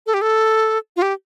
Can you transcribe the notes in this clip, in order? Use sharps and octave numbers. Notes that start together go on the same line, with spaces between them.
A4
G4
A4
F4
G4